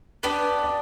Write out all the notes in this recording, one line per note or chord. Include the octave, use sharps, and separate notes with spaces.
B3 D4 G4 B4
D5